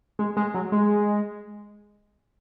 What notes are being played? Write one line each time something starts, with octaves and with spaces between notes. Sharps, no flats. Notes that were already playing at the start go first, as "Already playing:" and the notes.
G#3
G#3
F#3
G#3